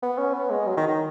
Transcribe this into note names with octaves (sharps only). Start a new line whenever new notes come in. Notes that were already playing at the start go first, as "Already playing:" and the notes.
B3
C#4
B3
G#3
F#3
D#3
D#3